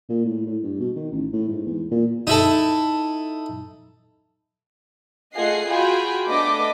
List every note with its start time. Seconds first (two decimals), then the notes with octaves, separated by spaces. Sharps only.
0.09 A#2
0.25 A2
0.46 A2
0.63 G2
0.80 B2
0.96 D#3
1.12 A1
1.33 A2
1.48 G#2
1.66 E2
1.91 A#2
2.27 D#4 E4 A4
5.34 A3 F4 G#4 D#5 F#5 C7
5.67 F4 F#4 G#4 G5 B5
6.27 A3 B3 D4 D#5 D6 B6